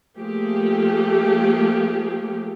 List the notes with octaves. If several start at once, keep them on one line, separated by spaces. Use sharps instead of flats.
F3 A3 A#3 G4 G#4